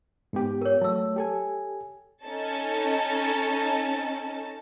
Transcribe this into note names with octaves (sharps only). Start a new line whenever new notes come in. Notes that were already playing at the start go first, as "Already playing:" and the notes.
G#2 B3 G4
A#4 C#5
F#3 A3 A5 E6
G4 A4 G#5
C#4 D#4 A4 A5